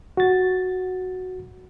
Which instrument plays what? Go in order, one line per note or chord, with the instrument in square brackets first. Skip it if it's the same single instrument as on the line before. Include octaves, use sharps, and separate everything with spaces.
[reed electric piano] F#4 A6